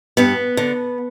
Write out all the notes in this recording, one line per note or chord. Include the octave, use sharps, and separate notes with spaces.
G2 B3
D3